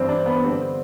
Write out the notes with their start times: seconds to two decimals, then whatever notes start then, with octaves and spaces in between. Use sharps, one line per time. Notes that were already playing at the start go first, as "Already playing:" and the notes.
Already playing: G2 E3 C4
0.09 D4
0.26 B3
0.44 G2 D3 C4